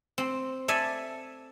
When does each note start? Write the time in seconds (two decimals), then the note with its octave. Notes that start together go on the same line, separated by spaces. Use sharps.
0.18 C4
0.68 A4 D5 E5 G#5